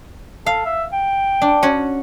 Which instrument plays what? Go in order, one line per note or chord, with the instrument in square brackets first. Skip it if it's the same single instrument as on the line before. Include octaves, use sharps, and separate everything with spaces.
[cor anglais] A4 [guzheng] F5
[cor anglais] E5
G5
[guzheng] D4
C#4 F#4 C#5